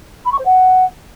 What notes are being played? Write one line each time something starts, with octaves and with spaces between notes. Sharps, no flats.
B5
C#6
C5
F#5